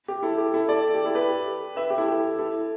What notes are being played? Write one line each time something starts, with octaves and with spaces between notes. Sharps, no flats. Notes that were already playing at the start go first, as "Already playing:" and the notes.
G4
E4 A4
G4
E4 A4
A4 D5
G4
E4 A4
G4 B4
B4 E5
G4
E4 A4
G4
E4 A4